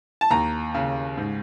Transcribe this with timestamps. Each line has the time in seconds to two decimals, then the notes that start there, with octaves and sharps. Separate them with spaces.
0.21 A5
0.30 D#2 A#5
0.74 C#3
1.18 G#2